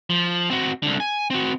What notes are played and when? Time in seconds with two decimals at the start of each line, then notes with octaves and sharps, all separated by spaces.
0.10 F3
0.51 C4 F#4
0.83 C2 D3
1.00 G#5
1.30 C4 F#4